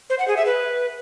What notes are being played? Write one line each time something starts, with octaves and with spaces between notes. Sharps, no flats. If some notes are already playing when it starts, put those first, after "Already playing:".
C5
F#5
G#4
E5
B4